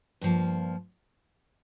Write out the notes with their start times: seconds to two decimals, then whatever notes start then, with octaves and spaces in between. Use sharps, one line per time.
0.21 G2 F3 A#3